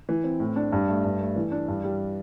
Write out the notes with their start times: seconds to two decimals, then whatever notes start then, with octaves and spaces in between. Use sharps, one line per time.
0.09 E3
0.24 C4
0.40 A2
0.56 D4
0.72 G2
0.89 A3
1.04 G2
1.20 A3
1.36 E3
1.52 D4
1.68 G2
1.84 G3